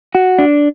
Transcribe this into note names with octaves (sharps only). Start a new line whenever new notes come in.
F#4
D4